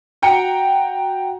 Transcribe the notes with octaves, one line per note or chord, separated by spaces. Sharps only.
F#4 G5 A#5 C#7